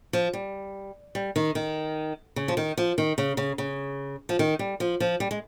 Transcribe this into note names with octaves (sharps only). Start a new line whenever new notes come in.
F3
G3
G3
D#3
D#3
C#3
F3
D#3
F3
D#3
C#3
C#3
C#3
F3
D#3
G3
F3
F3
G3
G#3